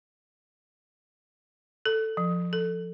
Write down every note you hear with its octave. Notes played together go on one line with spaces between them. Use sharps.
A4
F3
A4